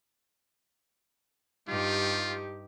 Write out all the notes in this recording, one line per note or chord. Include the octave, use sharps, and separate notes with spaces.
G2 D#4 F4 G4